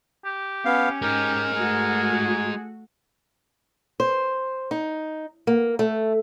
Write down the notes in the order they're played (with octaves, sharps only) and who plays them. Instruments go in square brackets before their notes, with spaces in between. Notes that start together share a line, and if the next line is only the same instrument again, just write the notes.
[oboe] G4
[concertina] B3 F5 [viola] C#4
[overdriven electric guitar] G#3 D#4 [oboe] G4 [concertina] A#4
[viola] A3 F#4 [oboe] G#4
[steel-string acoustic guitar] C5
D#4
A#3
A3